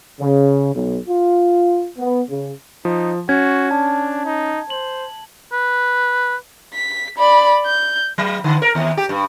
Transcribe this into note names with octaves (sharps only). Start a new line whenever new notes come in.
C#3
B1
F4
B3
C#3
F3 D#4
C#4 F#4 G#6
D4 A5
D#4
C5 F#7
B4
B6
D5 B5
G6
F#3
D3
A#4
D#2
G4
G2